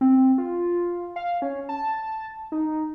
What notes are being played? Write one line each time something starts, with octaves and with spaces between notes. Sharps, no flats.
C4
F4
F5
C#4
A5
D#4